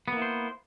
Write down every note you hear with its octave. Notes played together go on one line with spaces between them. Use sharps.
A#3 B3 E4 C5